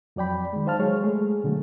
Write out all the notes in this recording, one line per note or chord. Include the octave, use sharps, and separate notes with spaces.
F2 F#3 D5 G5 B5
D#3 G#3
D#4 C5 F5 A5 F6
F#3 G#3 G#4 C#5
G#3 A3 G#4
B2 D3 F#3 A3